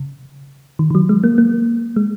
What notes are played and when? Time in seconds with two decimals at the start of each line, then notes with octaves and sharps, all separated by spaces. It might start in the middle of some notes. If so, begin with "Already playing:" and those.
Already playing: C#3
0.79 D#3
0.90 D#3
0.95 F#3
1.09 G#3
1.24 A#3
1.38 A#3
1.96 G#3